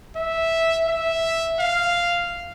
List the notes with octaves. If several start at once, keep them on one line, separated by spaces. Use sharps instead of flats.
E5
E5
F5